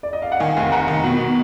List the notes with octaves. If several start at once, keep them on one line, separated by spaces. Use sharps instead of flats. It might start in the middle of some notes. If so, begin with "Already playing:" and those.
D5
D#5
F5
F#5
D#3 F5 G#5
F1 F5 G#5
F1 F#5 A#5
D#3
B2